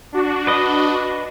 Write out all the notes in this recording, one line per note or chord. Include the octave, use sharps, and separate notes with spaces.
D4 F#4
B4 D#5